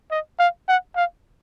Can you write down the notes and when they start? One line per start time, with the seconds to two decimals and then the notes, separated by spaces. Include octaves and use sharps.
0.11 D#5
0.39 F5
0.68 F#5
0.96 F5